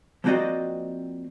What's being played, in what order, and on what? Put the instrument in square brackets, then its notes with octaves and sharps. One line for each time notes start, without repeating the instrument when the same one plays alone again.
[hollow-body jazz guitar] F3 A#3 C4 F#4 D5 D#5